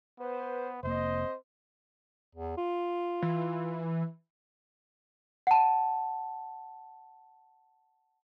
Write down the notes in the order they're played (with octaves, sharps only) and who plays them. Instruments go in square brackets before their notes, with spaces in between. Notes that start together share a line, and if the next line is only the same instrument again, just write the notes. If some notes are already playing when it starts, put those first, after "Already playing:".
[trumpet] B3 [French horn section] B4 C5
[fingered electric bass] F1 A#3 [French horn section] C4 D#5 [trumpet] C5
[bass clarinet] E2
F4
[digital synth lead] E3
[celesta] F#5 A5